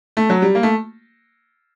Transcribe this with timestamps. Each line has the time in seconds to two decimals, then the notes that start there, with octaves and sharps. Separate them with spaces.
0.17 A3
0.30 F#3
0.42 G3
0.55 A#3
0.63 A3